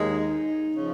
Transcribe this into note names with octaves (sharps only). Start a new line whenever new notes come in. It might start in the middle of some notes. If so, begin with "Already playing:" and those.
Already playing: D#2 D#3 G#3
D#4
C#3 F3